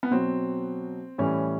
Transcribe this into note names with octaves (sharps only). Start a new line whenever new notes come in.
B3
B2 F#3 C4
A2 E3 G3 C#4